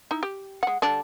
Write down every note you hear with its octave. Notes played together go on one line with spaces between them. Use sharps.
D#4 E4
G4
G#3 F#5
D3 G3 D4